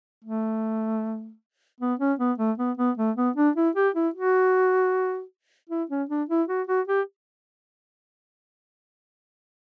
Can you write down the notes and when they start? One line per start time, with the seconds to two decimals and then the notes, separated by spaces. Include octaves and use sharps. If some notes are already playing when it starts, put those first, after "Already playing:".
0.24 A3
1.80 B3
2.00 C#4
2.19 B3
2.38 A3
2.58 B3
2.78 B3
2.98 A3
3.16 B3
3.36 D4
3.56 E4
3.75 G4
3.95 E4
4.14 F#4
5.70 E4
5.90 C#4
6.09 D4
6.29 E4
6.48 F#4
6.67 F#4
6.88 G4